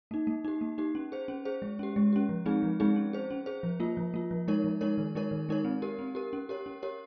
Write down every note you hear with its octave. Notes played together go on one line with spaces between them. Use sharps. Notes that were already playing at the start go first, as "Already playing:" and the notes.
A#3 D#4
A#3
D#4 G4
A#3
D#4 G4
C#4
G#4 C5
C#4
G#4 C5
G#3
C#4 G4
G#3
C#4 G4
F3
G#3 C4 D#4 G#4
F3
G#3 C4 D#4 G#4
C#4
G#4 C5
C#4
G#4 C5
F3
A#3 F4
F3
A#3 F4
F3
G#3 D#4 A#4 C#5
F3
G#3 D#4 A#4 C#5
D#3
G#3 D#4 A#4 C#5
D#3
G#3 D#4 A#4 C#5
C4
G4 A#4
C4
G4 A#4
C#4
G4 A#4 C#5
C#4
G4 A#4 C#5